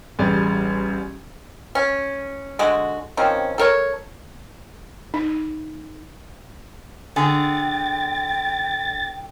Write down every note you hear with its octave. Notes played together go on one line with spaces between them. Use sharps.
A1 G3 G#4 D5 G#5
C#4
D3 G#3 F#4
D#3 F3 C4 C#4
A4 A#4 C#5
D#4
D3 G#4 G5 A6